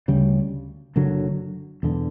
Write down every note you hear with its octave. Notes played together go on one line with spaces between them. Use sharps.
D2 C#3 G3
F#1 F#2 D3 F#3
E1 E2 D3